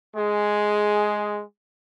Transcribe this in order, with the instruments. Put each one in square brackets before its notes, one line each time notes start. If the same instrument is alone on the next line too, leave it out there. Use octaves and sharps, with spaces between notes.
[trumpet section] G#3 G#4